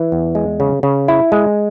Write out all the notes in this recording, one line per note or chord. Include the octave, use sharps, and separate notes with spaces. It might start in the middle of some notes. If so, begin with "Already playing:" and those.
Already playing: E3
E2
G#3
C#3
C#3
E4
G#3